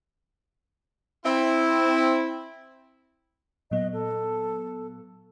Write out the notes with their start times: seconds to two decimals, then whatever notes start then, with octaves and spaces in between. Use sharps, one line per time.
1.25 C4 E4
3.71 A#2 F#3 B3 D#5
3.93 A4